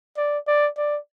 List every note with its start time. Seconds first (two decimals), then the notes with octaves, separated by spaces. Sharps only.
0.17 D5
0.48 D5
0.77 D5